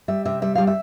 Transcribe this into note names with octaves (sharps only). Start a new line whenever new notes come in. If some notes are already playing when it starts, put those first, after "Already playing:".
G3 E5
C3 E5
G3 E5
G3 F5
E5